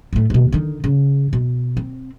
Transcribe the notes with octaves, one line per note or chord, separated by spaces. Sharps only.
A2 A3
D#2 B2
D3 D#3
C#3
B2
C4